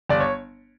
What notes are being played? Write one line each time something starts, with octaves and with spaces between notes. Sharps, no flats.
G1 D5
C#5